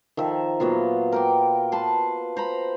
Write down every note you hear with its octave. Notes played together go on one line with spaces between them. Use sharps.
D#3 F3 E5
A#2 F#3 B3 F4
A#4 G5 D6
B4 A5 C6
C5 A#5 B5